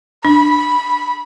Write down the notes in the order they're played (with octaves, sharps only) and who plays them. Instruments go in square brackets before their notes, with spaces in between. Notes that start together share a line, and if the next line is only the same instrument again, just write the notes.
[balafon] D4 [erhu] B5